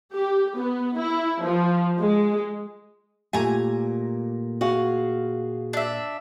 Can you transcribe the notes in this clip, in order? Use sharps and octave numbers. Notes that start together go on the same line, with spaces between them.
G4
B3
E4
F3
G#3
A#2 A3 G4 G#5 A#5
F#4 G#4 F5
D4 E5